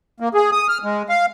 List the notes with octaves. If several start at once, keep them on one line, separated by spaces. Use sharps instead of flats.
A#3
G#4
D#6
F6
G#3
F5